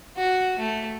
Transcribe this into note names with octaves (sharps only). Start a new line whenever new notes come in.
F#4
A3